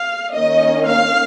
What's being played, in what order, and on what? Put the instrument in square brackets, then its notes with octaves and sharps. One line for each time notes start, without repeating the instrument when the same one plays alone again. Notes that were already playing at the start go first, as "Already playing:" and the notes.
Already playing: [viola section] F5
D#3 A#3 C#4 D#5
F5